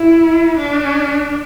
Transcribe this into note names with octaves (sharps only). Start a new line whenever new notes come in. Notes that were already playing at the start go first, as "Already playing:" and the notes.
Already playing: E4
D4